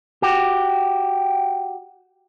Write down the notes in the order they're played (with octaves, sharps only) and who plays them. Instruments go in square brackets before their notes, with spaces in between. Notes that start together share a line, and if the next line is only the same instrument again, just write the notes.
[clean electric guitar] F#4 G4